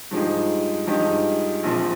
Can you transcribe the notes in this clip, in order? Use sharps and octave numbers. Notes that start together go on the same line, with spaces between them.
G2 F3 G#3 D#4 G4
G2 F3 G#3 D#4 G4
A#1 A#2 F3 C4